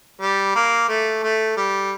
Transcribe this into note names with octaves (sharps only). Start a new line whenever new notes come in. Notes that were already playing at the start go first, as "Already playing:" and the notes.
G3
A#3
A3
A3
G3